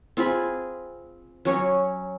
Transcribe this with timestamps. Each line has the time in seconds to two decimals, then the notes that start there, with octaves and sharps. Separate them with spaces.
0.17 C4 F4 G#4 B5
1.45 F#3 C#4 C#5